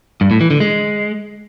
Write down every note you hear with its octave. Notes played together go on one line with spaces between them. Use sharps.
G2
A2
E3
D3
G#3